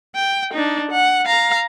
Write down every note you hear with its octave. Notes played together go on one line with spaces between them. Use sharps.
G5
D4 D#4
F#5
F5 A#5